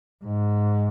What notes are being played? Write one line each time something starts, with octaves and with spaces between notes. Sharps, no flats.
G#2